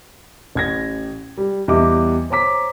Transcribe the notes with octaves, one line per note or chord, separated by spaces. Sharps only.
A1 G#6 A#6
G3
E2 G3 G4 D#5 E5 D6
C5 C#5 A#5 D6 B6